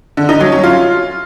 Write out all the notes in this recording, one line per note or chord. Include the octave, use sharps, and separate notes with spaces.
D3
D#4
F#3
C#4
F4